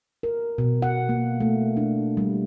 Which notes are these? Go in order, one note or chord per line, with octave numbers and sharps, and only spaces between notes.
A#4
B2
F#5
A#3
A3
D4
G3